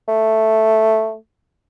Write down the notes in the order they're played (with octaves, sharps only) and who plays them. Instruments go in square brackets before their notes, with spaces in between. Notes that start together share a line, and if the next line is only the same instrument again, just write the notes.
[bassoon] A3